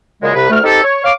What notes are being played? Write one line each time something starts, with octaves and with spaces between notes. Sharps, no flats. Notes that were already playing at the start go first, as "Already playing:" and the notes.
F#2 A#2 C#3 G#3
C2 C3 B4
D2 A3 F6
C4 D#4 G4 A4
C#5
C#5 F5 D6